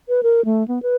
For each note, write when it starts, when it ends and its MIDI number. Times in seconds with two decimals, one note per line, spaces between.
0.09 0.21 71
0.23 0.44 70
0.45 0.66 57
0.68 0.82 59
0.83 0.96 71